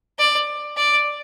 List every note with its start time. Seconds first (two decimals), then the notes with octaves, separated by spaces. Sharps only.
0.19 D5
0.77 D5